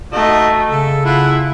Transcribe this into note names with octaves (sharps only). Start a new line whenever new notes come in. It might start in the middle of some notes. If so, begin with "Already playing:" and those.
A3 D#4 F#4 D#5
C#3 A4
E4 F4 F#5